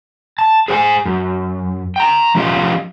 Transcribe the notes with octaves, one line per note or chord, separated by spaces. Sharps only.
A5
G#4 C5 G5 G#5
F#2
G5 A#5
F3 C#4 F4 G4 D#5 F5